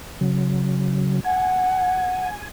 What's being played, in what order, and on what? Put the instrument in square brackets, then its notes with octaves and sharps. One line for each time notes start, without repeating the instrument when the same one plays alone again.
[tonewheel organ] C#3 F#3
[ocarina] F#5 [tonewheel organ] G#5